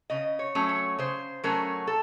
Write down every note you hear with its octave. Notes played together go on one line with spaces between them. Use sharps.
C#3 D#5
C#5
F#3 A3 C#4
C#5
C#3 C5
F#3 A3 C#4 A#4
A4